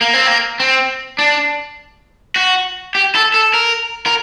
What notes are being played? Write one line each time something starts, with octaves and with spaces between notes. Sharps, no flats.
A#3
C4
A#3
C4
D4
F#4
G4
A4
A4
A#4
A#4